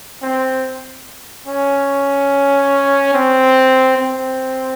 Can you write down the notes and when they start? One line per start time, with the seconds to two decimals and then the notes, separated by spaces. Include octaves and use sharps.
0.22 C4
1.47 C#4
3.14 C4
3.97 C4